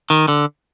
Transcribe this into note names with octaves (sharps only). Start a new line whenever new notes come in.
D#3
D3